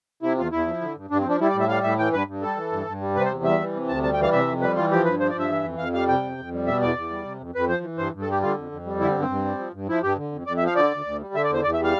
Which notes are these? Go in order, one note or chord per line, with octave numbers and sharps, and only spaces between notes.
C3 E4
E2 F4
E2 E4
F3
D3
G2
G2 D4
C4
F3 D4
G3 E4
D5
A2
E5
G3 F5
A2 E5
E3 G5
G2 B4
G2
G3 A4
E3
G2
G2
G3
C3 B4
C5
E2
G3 E5
E3
C3
D2 A5
G3 A5
G5
E3 F5
C3 E5
F2
G3 B4
E3 F4
F3 G4
G2 B4
F3 C5
D5
G2 E5
E3
F2
F2 F5
G3 F5
C3 G5
F2
F2
G3
B2 E5
E2 D5
E2
G3
C3
F2
F2 B4
F3 C5
E3
G2 C5
G2
A4
G3 G4
D3 F4
F2
F2
G3
D3 E4
C4
G2
C4
G2
G3
F3
G2
F3 E4
G2 G4
D3
F2
F2 D5
E5
F3
F5
D3 D5
D2
D2
G3
D3 E5
D5
E2 C5
E2 D5
E5
G3
F5